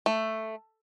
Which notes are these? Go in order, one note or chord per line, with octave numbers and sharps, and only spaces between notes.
A3